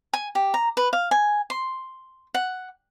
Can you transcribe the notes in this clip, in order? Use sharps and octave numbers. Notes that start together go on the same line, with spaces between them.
G#5
G4
A#5
B4
F5
G#5
C6
F#5